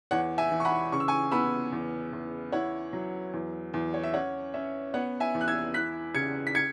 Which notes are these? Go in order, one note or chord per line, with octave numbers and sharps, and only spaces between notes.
E2 C#5 F#5
E5 G#5
E3
C#6
F#5 B5
C#3 C#6
E6
G#5 C#6
B3 B5 E6
E2
E2
E4 C#5 F#5
F#3
E2
E2
C#5
E5
C#4 C#5 F#5
C#4 E5
B3 C#5 F#5
E5 G#5
E2
F#6
E6 G#6
E4 F#6 B6
C#3 G#6 C#7
B6
G#6 C#7